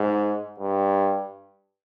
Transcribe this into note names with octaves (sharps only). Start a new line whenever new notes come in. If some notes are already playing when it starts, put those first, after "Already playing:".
Already playing: G#2
G2